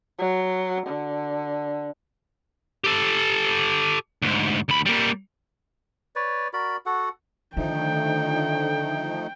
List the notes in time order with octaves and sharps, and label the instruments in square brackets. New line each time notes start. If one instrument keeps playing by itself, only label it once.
[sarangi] F#3
D3
[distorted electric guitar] G4 A4
D2 G#2
D2 B5
G3 A#3
[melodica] B4 C#5 D5
F#4 A#4 D5 B5
F#4 A4 F#5
[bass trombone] D3 [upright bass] D#3 [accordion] F3 A3 D#4 [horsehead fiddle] G5